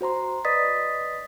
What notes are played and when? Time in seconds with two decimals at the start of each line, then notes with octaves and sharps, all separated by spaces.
0.01 F#4 C5 A#5 C6
0.45 B4 D5 D#5 D#6 A6 B6